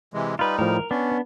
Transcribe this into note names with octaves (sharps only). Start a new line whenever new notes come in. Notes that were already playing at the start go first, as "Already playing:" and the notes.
C3 E3 G#3
G3 D#4 F4 B4
A2 F3 A#4
B3 C#4 D4 D5